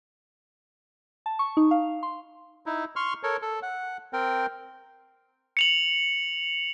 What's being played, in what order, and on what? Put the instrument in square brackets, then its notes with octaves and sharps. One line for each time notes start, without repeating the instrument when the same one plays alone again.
[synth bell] A5
C#6
D#4
F5
C6
[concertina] D#4 E4
C6 C#6 F6
A4 A#4 C#5
A4
F#5
C4 A#4 G5
[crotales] C#7 F7 F#7